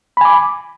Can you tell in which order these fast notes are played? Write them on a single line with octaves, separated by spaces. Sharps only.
B5 G#5 D6